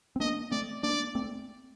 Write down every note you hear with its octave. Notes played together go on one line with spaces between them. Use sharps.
C4
A#3 D4 D#5
A3 C4 D5
A#3 D4 D5
A3 C4